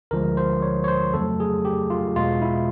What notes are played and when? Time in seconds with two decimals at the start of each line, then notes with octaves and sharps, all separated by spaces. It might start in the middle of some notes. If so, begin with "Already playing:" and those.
0.11 D2 D3 F3 G#3 A#4
0.37 C5
0.62 C#5
0.84 C#5
0.88 C5
1.13 F2 C#3 F#3 A3 A4
1.40 G#4
1.65 G4
1.90 F4
2.16 E2 B2 G#3 F4
2.42 E4